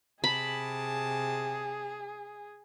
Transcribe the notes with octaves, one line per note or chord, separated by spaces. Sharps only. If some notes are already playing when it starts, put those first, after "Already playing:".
C3 G#4 A5 B5